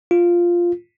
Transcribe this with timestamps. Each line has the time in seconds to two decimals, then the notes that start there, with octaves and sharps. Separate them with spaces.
0.11 F4